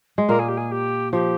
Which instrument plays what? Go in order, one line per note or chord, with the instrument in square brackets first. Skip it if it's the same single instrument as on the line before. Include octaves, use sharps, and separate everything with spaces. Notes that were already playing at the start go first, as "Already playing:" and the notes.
[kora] G#3
[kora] A#2 A#3 [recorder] A#4
[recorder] G#4
G4
G#4
G4
[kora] F3 [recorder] G4